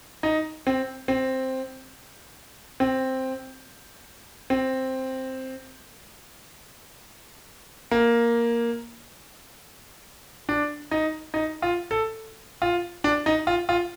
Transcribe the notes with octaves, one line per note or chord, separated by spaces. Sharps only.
D#4
C4
C4
C4
C4
A#3
D4
D#4
D#4
F4
A4
F4
D4
D#4
F4
F4